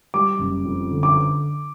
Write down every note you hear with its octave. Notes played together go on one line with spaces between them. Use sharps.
G3 D6
F#1
F2
D3
D6